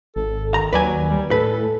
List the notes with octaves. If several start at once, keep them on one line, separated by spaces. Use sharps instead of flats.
G#1 A4
D#3 A#5
D#2 F#3 B4 D5 G#5
G3
A2 A4 B4